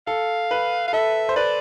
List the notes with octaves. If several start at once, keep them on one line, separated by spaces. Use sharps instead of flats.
A4 F5
B4
F5
A4 E5
C5
B4 D5